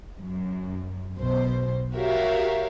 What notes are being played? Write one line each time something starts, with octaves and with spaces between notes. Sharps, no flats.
F#2
B1 B2 C5
F#4 G4 A#4 C#5 E5 F5